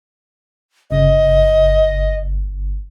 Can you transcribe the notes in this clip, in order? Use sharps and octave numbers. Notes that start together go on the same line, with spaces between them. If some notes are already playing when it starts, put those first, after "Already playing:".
G1 C#3 D#5